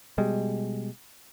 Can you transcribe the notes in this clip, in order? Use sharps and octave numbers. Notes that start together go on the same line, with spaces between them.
B2 G3 G#3